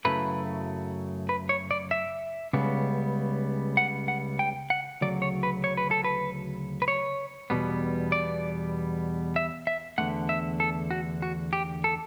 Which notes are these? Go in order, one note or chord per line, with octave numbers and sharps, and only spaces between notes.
F#2 C#3 F#3 A3 E4 B4
B4
C#5
D5
E5
C#2 C#3 G3 B3
F#5
F#5
G5
F#5
D2 C#3 F#3 D5
C#5
B4
C#5
B4
A4
B4
B4
C#5
E2 B2 G3 B3
D5
E5
E5
E2 D3 A3 F#5
E5
A4
F#4
F#4
G4
A4